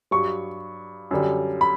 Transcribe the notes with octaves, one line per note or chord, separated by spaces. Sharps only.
G2 F#3 C#6
F#2 D3 G3
B5